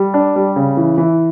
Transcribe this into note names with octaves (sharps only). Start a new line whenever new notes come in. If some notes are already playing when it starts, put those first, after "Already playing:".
Already playing: G3
D4
G3
C#3
E3
E3